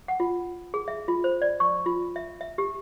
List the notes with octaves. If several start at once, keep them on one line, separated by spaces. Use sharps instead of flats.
F#5
F4
G#4
E5
F4
C5
D5
C#6
F4
E5
E5
G4